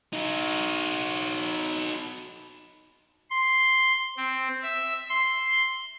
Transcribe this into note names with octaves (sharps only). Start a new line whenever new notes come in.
D#4 F#4
C6
C4
E5
C6